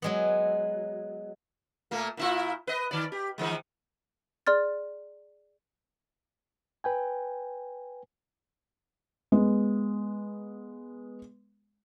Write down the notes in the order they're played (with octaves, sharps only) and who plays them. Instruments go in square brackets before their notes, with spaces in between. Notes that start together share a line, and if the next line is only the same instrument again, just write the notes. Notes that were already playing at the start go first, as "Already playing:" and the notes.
[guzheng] F#3 G#3 B3
[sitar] A#2 A3 A#3
A#2 E4 F4
B4 D#5
D#3 D5
G4
D#3 E3 G#3
[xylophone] G#4 D5 C6 F6 A6
[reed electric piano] B4 G5 G#5
[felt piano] G#3 B3